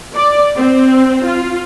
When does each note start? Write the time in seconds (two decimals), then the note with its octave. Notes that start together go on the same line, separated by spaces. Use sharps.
0.14 D5
0.57 C4
1.25 F4